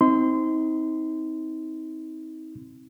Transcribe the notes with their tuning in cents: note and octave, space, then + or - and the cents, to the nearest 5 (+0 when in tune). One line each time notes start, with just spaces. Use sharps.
C4 +0 D#4 +35 C6 -20